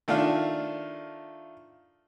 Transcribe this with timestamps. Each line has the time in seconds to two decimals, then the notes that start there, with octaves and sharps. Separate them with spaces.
0.08 D#3 A3 D4 F4 F5